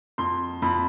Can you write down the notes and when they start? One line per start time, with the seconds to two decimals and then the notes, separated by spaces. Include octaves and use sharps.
0.18 F2 C6
0.62 F2 B5